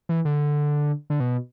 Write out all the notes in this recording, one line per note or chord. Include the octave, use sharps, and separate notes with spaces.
E3
D3
D3
B2